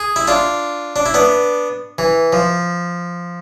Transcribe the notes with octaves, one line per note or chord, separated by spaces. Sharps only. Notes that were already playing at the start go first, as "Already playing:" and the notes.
Already playing: G#4
E4
D4 F4
D4
E4
B3 D4
E3
F3